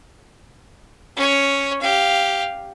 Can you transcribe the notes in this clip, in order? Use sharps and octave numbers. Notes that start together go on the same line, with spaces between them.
C#4 C#5
G4 F5